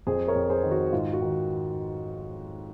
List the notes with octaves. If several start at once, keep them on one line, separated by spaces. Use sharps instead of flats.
F2 G#4 C5
A#4 C#5
F2
G#4 C5
D#3
F#4
G#2 F4
F#4
D#3